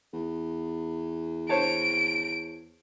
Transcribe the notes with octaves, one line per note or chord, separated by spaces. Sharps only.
E2
C5 C#5 A5 D7